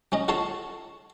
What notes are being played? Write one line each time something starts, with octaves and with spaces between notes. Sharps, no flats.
F#3 C#4 D#5
F4 F#4 A4 C#5 A5 C6